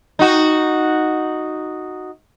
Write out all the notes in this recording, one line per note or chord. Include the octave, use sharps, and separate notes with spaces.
D#4 F#4